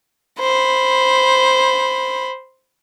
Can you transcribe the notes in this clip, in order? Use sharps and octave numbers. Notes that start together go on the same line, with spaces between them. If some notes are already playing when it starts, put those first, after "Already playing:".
C5 B5